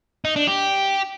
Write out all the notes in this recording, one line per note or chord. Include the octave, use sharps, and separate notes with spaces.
D#4
D4
G4